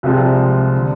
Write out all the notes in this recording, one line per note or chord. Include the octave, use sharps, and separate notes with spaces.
C2 C3 F3 G#3 C4
D3